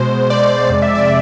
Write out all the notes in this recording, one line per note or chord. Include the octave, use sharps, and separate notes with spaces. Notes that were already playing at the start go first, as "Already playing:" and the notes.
Already playing: B2 G#3 C5
D5
F2 C3 G#3 D5
E5
D5